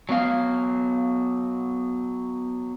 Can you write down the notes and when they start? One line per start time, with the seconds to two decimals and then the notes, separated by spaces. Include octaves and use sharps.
0.09 F#3 B3 F5